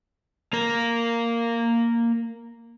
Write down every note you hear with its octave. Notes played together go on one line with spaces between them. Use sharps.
A#3 A#4